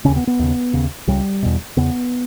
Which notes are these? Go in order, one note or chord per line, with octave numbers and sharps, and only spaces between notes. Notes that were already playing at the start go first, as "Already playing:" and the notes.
D#2 C#3 C#4
B3
B3
D#2 C#3
D#2 C#3
C#2 C#3 G3
E2 B2
E2 C#3 B3